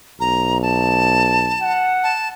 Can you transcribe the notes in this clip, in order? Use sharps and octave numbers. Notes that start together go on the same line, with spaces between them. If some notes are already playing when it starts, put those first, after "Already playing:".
B1 A#5
A5
F#5
A5